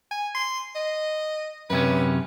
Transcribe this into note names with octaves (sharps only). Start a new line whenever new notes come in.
G#5
C6
D#5
F#2 C3 C#4 B4